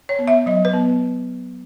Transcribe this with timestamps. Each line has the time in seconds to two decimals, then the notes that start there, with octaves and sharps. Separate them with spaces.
0.09 C#5
0.19 B3
0.28 E5
0.46 F#3 D#5
0.65 B4
0.73 B3